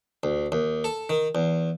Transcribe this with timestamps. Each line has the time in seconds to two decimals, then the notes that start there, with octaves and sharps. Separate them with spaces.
0.23 D2
0.52 D#2
0.84 A4
1.09 D#3
1.35 E2